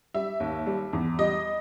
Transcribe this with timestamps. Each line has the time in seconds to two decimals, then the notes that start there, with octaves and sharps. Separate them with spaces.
0.14 G3 E5
0.40 D#2
0.67 G3
0.93 E2
1.19 G3 D#5